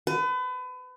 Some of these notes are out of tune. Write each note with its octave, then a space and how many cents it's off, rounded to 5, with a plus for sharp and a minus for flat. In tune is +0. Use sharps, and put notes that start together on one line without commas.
B4 +35